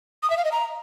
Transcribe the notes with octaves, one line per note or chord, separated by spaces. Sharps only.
D#6
E5
F5
D#5
A#5